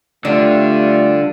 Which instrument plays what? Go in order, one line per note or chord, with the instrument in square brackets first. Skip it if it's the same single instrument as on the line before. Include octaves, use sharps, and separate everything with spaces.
[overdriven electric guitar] D3 [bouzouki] G3 [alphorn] A3 [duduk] F4